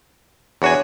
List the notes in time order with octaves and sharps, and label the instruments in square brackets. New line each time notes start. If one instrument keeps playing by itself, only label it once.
[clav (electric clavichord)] E2 F#4 G#5 [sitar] D4 C#5